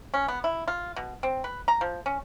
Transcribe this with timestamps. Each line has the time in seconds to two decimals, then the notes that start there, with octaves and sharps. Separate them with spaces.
0.14 C#4
0.28 B3
0.44 E4
0.68 F4
0.96 B2
1.23 C4
1.44 B4
1.68 A#5
1.81 F3
2.06 C#4